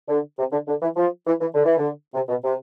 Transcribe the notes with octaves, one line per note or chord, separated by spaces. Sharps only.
D3
C3
D3
D3
E3
F3
E3
E3
D3
E3
D3
C3
B2
C3